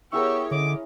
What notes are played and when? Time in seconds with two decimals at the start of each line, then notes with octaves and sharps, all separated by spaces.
0.13 B3 E4 G4 G#4 A#4 C#5 C#6 E6
0.51 D3 C#4 D#5 D6